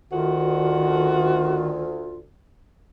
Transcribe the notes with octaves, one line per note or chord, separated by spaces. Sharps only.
D2 D#3 F4 F#4